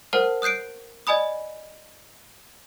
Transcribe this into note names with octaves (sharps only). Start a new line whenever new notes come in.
A#4 C5 F#5 A5 F6
D#6 F#6 G6 C7 D7
D5 D#5 G#5 B5 D#6